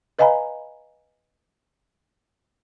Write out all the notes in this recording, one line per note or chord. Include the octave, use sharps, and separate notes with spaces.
B4 D#5 F5 G#5 A#5 B5